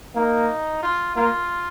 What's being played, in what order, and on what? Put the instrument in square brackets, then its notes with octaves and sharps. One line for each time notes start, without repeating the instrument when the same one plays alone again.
[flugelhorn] A#3 [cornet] D#4
[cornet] F4
[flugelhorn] A#3 [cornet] F4